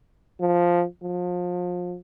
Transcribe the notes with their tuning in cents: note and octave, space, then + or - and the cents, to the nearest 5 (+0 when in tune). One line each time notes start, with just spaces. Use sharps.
F3 +0
F3 +30